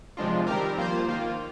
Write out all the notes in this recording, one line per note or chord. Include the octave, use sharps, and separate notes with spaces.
C3 F3 G#3 D4 F4
D#3 G3 C4 G4 A#4
F3 A#3 F4 C5
D#3 A#3 F4